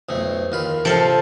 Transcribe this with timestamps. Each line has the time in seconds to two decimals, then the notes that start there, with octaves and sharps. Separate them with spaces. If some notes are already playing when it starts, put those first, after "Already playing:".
0.09 B1 F2 A3
0.52 D#2 F4 B5
0.85 C3 F3 A4 F5